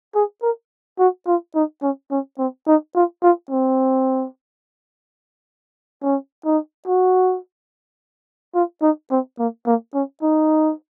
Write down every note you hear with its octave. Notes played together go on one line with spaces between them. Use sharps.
G#4
A#4
F#4
F4
D#4
C#4
C#4
C4
D#4
F4
F4
C4
C#4
D#4
F#4
F4
D#4
C4
A#3
A#3
C#4
D#4